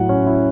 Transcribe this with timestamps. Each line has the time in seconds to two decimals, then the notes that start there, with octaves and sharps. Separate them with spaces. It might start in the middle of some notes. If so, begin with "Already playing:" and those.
Already playing: A2 F#3 F#5
0.09 C#4
0.27 E4